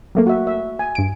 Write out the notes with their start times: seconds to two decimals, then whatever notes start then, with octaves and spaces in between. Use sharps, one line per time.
0.15 F#3 A3 A#3
0.27 F#4 E5
0.47 E5
0.79 G#5
0.95 G2 D7